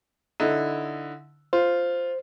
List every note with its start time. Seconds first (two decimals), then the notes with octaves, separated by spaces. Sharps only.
0.40 D3 D#4 E4
1.53 F4 C5